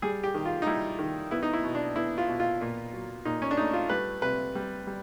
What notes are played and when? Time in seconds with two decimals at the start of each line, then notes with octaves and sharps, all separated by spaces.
0.02 G3 G#4
0.24 G4
0.35 D#3
0.45 F4
0.62 D#4
0.66 G3 E4
0.99 D#3
1.31 B3 E4
1.43 D#4
1.53 E4
1.64 B2
1.75 D4
1.96 B3 E4
2.18 F4
2.29 B2
2.40 F4
2.61 A#2
2.93 F#3
3.25 A#2 D#4
3.42 C#4
3.51 D4
3.57 A3 D#4
3.73 F4
3.90 G3 B4
4.22 C3 B4
4.55 G3
4.87 G3